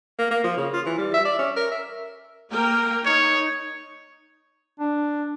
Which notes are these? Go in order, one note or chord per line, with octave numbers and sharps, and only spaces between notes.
A#3
A#3
F3
C#3
F4
E3
G3
E5
D5
C#4
A#4
E5
A#3 A#4 G5
D#4 C#5
D4